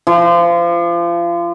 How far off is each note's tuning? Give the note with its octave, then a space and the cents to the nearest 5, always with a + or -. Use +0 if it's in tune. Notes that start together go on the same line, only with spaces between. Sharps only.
F3 -30